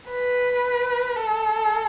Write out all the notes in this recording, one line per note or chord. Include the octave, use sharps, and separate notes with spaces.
B4
A4